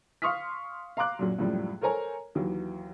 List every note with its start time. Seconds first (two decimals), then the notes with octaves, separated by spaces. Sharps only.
0.22 F5 C6 C#6 D#6 F6 B6
0.97 F5 A#5 C6 D6 F#6
1.19 F#2 A#2 F#3
1.38 C#2 F#2 A2 F3 G3
1.81 A4 A#4 C5 C#5 G#5 A#5
2.35 D#2 E3 F#3